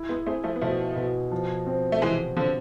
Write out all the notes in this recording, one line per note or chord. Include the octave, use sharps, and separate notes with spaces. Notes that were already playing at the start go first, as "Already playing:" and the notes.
Already playing: E4
G#3 B3
A3 C4 G#4
F3 A3
B3
B2 F3 A3
B2
F3
C4
A3
C3 E3 G#3
D3 F3 C4